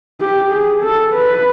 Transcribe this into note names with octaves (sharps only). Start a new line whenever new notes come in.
G4
G#4
A4
B4